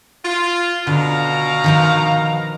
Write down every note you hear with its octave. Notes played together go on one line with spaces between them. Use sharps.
F4
B2 D3 F5 A#5
D#3 F3 D#4